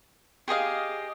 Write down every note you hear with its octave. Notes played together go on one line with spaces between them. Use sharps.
G4 G#4 D#5 F5